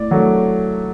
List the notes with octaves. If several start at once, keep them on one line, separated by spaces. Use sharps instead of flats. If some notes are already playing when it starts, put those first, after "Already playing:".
Already playing: A2 D5
F#3 A3